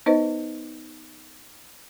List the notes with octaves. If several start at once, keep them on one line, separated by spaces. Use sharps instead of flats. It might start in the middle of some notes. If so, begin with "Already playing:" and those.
B3 D#4 B4 C5 D#5